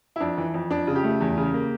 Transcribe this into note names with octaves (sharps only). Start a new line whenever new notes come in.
E4
F2 D4
E3
F2
F2 D4
C#3
G4
A3
E2
C#3
A#3